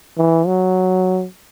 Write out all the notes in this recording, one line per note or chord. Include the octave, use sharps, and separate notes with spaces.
E3
F#3